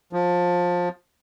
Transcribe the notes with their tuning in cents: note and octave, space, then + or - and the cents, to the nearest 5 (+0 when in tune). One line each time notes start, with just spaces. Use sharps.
F3 +20